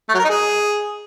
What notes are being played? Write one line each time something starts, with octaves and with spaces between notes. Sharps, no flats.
A3
F#3
A#4
D#4
G#4